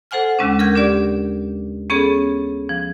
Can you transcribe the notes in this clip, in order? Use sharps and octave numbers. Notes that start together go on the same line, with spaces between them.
A4 C5 F#5 G#5 F6
D#2 C#3 G#3 C#4 D4
A#4 F6 G6 G#6
D4 G4 D5
B3 C#4 G#4 A4 C#5
F3